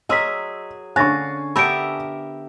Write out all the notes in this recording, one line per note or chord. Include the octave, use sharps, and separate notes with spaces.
F#3 G#4 A#4 D#5 C6 E6 B6
D3 C#4 F5 G#5 C#6 F#6 A6 A#6
B3 D4 G4 A4 A#4 E5 B5 D7